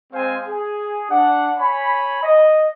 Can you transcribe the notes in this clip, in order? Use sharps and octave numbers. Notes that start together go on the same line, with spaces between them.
G#3 C4 C5 F5 G#5
G#4
D4 F#5
C#5 G#5 B5
D#5